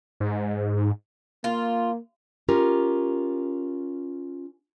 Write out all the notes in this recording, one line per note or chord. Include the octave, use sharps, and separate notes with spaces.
G#2
A#3 F4
C#4 F4 G4 A#4